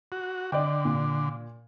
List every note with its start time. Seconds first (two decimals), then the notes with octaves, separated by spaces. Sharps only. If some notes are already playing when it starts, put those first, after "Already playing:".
0.12 F#4
0.52 D3 D5 D#5 G5
0.85 A#2